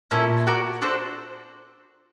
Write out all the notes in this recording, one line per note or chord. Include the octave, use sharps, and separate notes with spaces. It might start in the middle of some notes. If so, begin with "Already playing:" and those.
A#2 C#4 E4 A4
F#4 A#4 D5
D4 F#4 A4 C5